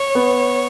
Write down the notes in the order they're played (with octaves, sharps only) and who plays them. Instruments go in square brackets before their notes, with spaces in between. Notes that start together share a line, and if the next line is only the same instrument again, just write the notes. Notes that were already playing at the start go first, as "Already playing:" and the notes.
Already playing: [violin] C#5
[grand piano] B3